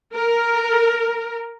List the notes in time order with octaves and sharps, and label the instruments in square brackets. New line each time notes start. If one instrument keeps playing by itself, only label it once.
[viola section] A#4